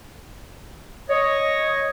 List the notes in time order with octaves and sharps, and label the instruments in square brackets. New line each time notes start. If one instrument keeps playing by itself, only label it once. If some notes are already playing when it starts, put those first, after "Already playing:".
[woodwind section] C#5 D#5